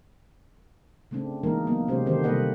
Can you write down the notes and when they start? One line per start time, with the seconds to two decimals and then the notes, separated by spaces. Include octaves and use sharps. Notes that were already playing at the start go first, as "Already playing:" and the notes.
1.11 C#3 A3 C4 D4
1.43 B2 E3 G#3 A#3 D#4 A#4
1.67 F#3 A#3 B3
1.88 C3 G#3 C#4 G4 C5
2.06 D3 D#3 C4 D4 G4 C5
2.23 C3 G3 A#3 B4 D#5 F#5